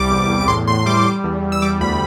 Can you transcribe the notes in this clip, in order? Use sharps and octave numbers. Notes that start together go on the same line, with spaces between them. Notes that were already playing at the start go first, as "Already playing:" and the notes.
Already playing: C2 G3 D6
E2
E2
D6
A2 C6
A2 C6
G3 D6
G3
E2
E2
E6
G3 D6
D2 B5